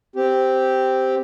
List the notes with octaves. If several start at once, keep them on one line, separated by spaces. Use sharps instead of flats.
C4 G4